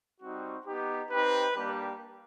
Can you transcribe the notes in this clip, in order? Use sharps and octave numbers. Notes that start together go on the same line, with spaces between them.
G3 C4 D#4 F#4
B3 D#4 G4
C4 D#4 G4 B4
G3 A#3 D4 G4